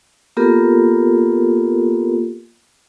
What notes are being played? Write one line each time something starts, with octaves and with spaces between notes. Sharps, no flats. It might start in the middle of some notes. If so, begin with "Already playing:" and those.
A#3 B3 F4 G4 A4 A#4